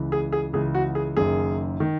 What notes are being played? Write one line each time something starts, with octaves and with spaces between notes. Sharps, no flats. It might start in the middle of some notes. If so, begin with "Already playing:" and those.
Already playing: C#2 C#3 E3
G#4
G#4
C#2 C#3 E3 G#4
F#4
G#4
F#1 F#2 D#3 G#4
D#3